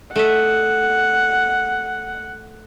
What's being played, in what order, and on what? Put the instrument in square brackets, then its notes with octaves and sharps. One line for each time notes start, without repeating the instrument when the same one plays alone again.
[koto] A3 D#5 E5 [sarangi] F#5